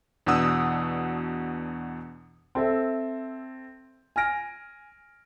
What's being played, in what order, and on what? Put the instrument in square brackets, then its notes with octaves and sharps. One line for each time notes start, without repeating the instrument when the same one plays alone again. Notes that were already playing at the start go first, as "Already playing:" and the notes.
[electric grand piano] E2 B2 D4 F#5 D#6 E6
[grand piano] C4 A4 E5
G#5 F6 A#6 D7